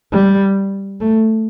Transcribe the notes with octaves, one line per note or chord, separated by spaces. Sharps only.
G3
A3